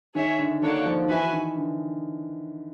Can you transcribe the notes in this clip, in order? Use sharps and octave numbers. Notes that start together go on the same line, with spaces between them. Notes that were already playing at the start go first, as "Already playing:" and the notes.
D#3 G#4 C#5 E5
D3
D#3 A#3 D4 F#4 A4 C#5
F3
D#3
E3 F#4 B4 E5 G#5
D#3
D3